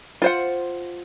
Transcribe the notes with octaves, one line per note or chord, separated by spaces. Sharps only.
F4 C5 F#5